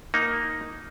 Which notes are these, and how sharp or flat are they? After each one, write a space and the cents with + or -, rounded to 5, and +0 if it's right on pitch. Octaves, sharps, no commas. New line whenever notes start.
A#3 +0 D#4 +0